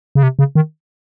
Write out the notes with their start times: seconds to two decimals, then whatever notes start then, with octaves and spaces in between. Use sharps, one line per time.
0.15 C#3
0.23 C3
0.39 C#3
0.55 D#3